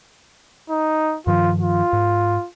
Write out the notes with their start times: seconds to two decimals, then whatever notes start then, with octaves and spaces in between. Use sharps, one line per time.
0.70 D#4
1.27 G2 D#3 F3 F4
1.61 F4
1.93 G#2